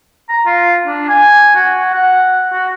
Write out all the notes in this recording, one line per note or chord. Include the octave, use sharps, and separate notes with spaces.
A#5
F4
D4
G#5
F#4
F#5
F#4